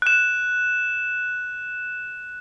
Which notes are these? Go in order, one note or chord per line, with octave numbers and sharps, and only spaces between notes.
F#6 E7